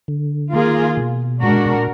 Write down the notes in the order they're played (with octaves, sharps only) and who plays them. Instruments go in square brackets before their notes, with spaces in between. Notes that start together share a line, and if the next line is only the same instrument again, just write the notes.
[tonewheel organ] D3
[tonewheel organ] D#3 [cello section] A#3 F4 G#4
[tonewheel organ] B2
[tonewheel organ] A#2 [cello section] G#3 D4 F#4 A#4
[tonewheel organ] B2
A#2
B2
A#2